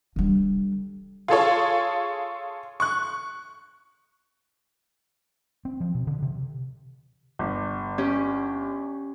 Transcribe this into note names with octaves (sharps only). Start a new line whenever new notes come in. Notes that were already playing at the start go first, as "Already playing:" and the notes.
D3 G3
F4 G#4 A4 C#5
C#6 F#6
C4
F3
B2
D3
C3
G1
C#4 G4